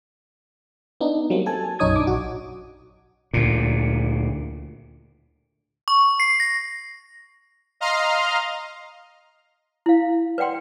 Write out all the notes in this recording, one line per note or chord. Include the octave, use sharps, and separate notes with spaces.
B3 D4 D#4
F#3 G3 A#3 C4
A4 G#5 A5
B1 F#2 D#4 C#5 D#6 G#6
D4 D6
A#1 F#4
D2 A#2
C#6
C7
A#6
D#5 F5 A#5 C6 F6
E4 F5
B4 D5 F#5 G5 C6